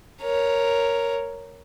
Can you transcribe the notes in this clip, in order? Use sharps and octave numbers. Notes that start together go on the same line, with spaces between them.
A#4 C#5